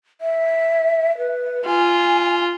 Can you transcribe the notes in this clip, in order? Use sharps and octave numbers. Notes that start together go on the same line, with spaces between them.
E5
B4
F4 G#5